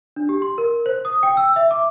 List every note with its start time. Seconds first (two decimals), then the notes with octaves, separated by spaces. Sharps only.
0.16 D4
0.29 G4
0.42 C6
0.58 A#4
0.86 C5
1.05 D#6
1.23 G5
1.37 E6
1.56 E5
1.71 D6